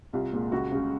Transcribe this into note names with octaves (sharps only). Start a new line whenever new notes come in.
C2 F4
A#2 G#3
C#2 F#4
C#3 G#3